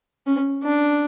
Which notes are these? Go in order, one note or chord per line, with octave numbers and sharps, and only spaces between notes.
C#4
D4